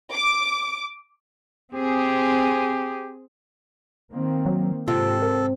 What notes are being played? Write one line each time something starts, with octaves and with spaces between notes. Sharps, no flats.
D6
C4 G4 G#4
D#3 A#3 C4
F#3
G#2 C3 F4 A4
A#4